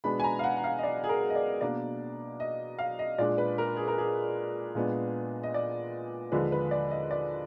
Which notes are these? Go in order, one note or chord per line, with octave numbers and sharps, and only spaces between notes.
B2 G#3 B3 D4 B5
G#5
A#5
F5
F#5
F#5
F5
D#5
D5
G#4
A#4
D#5
D5
B2 A#3 D4 D5
D#5
F5
D#5
A#2 G#3 D4 D5
B4
A#4
G#4
A#4
G#4
A#2 G#3 B3 D4
D#5
D5
D#2 D3 F3 G#3 D4 B4
B4
D5
D#5
D5